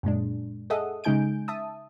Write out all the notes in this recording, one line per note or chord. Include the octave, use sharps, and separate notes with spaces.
F#2 A#2 G#3 D4
G#4 A4 D#5 E5 F#5 D#6
C#3 G#3 D#4 G#5 G6 D7
E5 A5 D#6